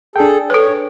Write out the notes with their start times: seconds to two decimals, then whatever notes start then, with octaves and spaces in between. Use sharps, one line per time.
0.16 D4 G#4 A4 G5
0.50 A4 B4 C#5